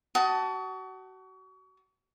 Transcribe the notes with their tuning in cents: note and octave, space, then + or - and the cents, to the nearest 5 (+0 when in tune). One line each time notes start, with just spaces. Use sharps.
F#4 +30 A5 +0 D#6 +20